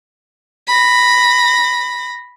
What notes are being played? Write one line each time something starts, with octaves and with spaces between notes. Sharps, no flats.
B5 A#6